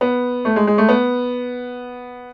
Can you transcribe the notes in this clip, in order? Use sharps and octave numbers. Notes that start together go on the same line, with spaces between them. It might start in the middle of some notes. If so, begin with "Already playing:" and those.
B3
A3
G#3
G#3
A3
B3